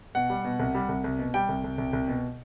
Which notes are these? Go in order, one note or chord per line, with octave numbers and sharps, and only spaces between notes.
B2 F#5
G3
B2
C2
G3
C2
C2
B2
G3 G5
C2
C2
C2
C2
B2